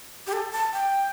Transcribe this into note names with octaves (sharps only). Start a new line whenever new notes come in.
G4
A4
A5
G5